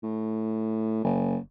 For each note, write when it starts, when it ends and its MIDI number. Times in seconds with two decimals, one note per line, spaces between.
0.03 1.02 45
1.04 1.38 30